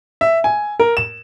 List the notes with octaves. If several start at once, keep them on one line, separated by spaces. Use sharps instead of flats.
E5
G#5
A#4
E7